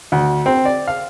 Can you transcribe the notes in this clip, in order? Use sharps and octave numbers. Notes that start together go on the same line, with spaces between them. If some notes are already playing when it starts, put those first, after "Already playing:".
D2
C4
D5
F5